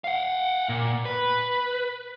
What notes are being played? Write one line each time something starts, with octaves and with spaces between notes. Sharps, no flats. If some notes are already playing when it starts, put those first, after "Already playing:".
F5 F#5
A#2
B4